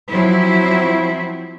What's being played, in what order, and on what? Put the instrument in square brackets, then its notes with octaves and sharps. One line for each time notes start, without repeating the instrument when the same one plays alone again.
[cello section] F3 F#3 C4 E4